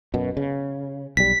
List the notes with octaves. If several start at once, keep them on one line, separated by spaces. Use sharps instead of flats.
F#2 B2
C#3
B1 G3 B6